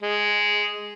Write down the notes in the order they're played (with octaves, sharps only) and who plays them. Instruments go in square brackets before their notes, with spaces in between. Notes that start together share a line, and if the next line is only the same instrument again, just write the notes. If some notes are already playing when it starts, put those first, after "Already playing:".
[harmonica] G#3